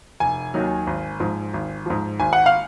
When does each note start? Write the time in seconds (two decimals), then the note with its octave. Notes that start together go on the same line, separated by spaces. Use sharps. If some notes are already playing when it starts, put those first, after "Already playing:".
0.20 F1 G#5
0.54 D#2 D#3 F#3
0.87 G#1
1.20 G#2 F3
1.54 G#1
1.86 G#2 F3
2.20 G#1 G#5
2.33 F#5
2.46 F5